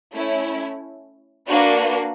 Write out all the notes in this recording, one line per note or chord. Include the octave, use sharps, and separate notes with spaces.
A3 C#4 E4
A#3 D4 F#4 B4